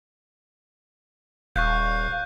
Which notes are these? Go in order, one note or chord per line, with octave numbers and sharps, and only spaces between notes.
D#1 F5 C#6 F#6 G6